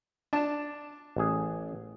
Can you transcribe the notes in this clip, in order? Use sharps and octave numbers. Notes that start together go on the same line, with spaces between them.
D4 A5
A1 G#4